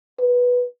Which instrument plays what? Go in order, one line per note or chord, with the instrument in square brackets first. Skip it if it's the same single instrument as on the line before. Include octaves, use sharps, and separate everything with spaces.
[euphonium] B4